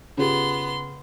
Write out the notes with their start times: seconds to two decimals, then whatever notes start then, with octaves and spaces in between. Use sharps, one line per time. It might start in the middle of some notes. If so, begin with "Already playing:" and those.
0.18 C#3 B3 F4 G4 C6